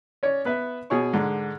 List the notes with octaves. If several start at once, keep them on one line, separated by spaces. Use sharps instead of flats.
C#4 C#5 D5
B3 B4 E5
B2 G#4 C#5 G#5 C#6
G#2 D3